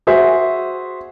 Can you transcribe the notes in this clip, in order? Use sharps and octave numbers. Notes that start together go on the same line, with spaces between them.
F#4 G#4 C5 E5